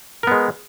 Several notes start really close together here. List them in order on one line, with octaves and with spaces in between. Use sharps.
A#4 B3 G#3